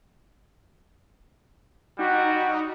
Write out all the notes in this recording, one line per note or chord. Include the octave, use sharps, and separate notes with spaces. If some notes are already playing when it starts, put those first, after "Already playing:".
G3 D#4 F#4